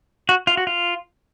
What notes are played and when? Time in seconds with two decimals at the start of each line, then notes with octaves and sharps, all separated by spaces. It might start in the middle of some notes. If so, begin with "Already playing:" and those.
0.29 F#4
0.47 F4
0.57 F#4
0.67 F4